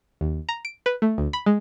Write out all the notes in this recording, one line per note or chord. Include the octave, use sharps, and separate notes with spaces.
D#2
A#5
D7
B4
A3
D2
B5
G#3